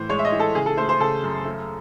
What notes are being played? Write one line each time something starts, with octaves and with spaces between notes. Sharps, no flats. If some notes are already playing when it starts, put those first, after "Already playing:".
Already playing: A2 E3 C5
G#3 C#5
E5
D#5
E3
A4
C#3 G#4
A4
A3 C5
C5
C#3 A4
F#2
A3